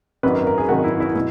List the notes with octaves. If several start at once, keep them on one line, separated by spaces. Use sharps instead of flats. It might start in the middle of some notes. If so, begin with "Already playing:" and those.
G#1 F#2 D#3 F#3 B4
A#4
A#4
G#4
G#1 F#2 D#3 F#3 F#4
E4
E4
B2 F#3 E4